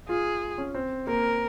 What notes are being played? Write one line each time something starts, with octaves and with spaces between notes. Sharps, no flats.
F4 G#4
C#4
C4
A#3 A#4